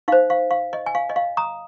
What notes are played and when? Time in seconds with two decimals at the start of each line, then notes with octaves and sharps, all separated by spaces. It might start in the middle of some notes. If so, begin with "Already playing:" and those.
0.08 D#4 F5
0.12 C5
0.30 F5
0.51 F5
0.73 D#5
0.86 G#5
0.95 F5
1.09 D#5
1.16 F5
1.37 A#5 D#6